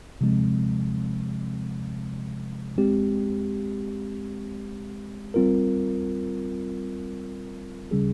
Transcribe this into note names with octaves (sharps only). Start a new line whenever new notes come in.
C3 F3 G#3 C4
G#3 C4 G4
G3 C4 F4 A#4
C#3 G3 C#4 G#4